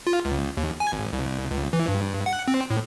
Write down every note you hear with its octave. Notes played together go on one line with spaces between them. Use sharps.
F4
C#2
D#2
G#5
G#1
C2
C#2
E3
G2
F#5
C4
A2